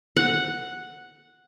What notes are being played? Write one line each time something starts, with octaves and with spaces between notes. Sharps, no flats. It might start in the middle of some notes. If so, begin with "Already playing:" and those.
F#5